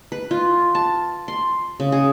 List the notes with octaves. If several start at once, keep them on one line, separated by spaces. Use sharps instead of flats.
B4
F4
A5
C6
C#3
G#4